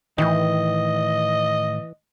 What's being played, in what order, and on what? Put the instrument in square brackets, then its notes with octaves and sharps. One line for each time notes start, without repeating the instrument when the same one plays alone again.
[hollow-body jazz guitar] A2 D#3 [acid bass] E3 [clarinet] D#5